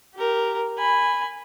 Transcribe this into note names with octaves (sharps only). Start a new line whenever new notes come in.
G4 A#4
G#5 B5